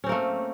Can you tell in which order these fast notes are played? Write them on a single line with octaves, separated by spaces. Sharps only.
C#4 C4 A#3 A3